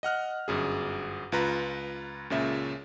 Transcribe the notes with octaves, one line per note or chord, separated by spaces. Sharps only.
D#5 F#5 F6 F#6
G1 F#2 G#4
C#2 F4 B4 A#5
C#2 A#2 C#3 E5